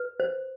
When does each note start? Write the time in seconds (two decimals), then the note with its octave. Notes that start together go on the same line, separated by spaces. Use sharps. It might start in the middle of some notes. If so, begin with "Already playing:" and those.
Already playing: B4
0.20 C5